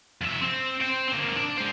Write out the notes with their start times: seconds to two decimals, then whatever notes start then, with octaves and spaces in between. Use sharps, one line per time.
0.21 F2 E5
0.41 C4
0.81 C5 G5
1.08 A#3 C4
1.36 D4
1.57 G#3 C5